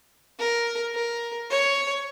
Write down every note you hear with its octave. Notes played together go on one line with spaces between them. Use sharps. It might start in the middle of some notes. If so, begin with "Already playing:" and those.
A#4
A#4
C#5